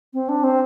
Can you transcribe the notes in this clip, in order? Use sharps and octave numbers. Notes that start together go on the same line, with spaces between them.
C4
D4
C4